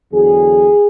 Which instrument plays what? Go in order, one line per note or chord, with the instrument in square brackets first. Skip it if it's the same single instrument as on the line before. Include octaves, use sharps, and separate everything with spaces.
[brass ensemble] E2 D3 F#3 G#4